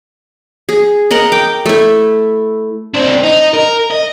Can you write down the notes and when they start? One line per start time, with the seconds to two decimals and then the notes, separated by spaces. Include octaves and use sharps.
0.69 G#4
1.11 A#4 D#5 F#5 A#5
1.32 G5 D6
1.66 A3 E4
2.94 C4 D4
3.23 D#4
3.54 A#4
3.90 D#5